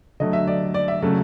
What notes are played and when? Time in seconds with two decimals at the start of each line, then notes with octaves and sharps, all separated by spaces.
0.20 D3 F#3 A3 D#5
0.33 E5
0.47 D5
0.74 D5
0.88 E5
1.02 C#3 F#3 A3